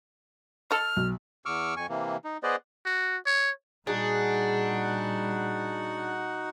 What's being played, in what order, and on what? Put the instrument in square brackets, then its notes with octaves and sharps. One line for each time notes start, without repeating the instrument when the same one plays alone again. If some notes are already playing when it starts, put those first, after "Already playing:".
[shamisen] A4 D#5 [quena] F6
[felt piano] B1
[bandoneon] E2 C#6 D6 E6 F6
F2 G#5 C#6
C3 E3 A#3
D#4
B3 G#4 B4 C5 D5 D#5
[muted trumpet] F#4
C#5
[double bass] A#2 G3 [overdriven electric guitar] D4 [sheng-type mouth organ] D#4 F#4 F#5 [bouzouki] G#4